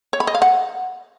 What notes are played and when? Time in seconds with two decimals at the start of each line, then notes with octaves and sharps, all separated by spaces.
0.13 C#5
0.20 B5
0.27 D#5
0.35 F5
0.42 F#5